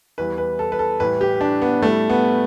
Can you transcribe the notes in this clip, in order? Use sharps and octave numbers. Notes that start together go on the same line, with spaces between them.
E2 E3 G3 B4
B4
A4
B4
A4
A2 E3 G3 B4
G4
D4
B3
A2 G3 A3
B3